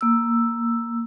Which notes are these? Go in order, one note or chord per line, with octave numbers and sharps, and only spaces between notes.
A#3 E6